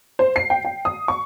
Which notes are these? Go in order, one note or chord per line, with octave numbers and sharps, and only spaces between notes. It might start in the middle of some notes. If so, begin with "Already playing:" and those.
C5
C7
G5
G5
D#6
C#6